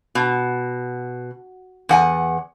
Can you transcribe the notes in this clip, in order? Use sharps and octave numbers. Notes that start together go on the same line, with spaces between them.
B2
E2 F#5 G#5